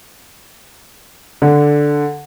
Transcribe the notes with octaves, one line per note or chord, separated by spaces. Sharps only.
D3